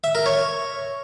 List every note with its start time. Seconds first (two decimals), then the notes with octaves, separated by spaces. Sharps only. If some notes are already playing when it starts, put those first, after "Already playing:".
0.04 E5
0.15 A#4
0.26 C#5